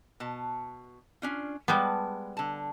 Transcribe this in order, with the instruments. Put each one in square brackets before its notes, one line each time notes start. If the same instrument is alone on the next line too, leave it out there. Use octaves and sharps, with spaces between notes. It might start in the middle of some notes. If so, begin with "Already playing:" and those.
[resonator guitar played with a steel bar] B2 A5
C#4 D4 F4
[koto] G3 B3 [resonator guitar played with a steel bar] G#3 A5
[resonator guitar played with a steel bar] D3 A5